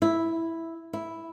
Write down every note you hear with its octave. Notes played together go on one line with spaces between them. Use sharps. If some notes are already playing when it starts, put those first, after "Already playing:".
E4
E4